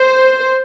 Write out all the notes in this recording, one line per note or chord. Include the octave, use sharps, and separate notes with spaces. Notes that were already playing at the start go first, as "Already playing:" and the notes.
Already playing: C5